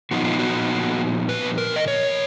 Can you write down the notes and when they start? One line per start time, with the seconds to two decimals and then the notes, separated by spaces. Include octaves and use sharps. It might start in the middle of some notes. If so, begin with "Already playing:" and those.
0.11 A#2 F3 B3 D#4 F#4
0.25 F4
0.39 F#4
1.29 B4
1.58 A#4
1.76 D#5
1.88 C#5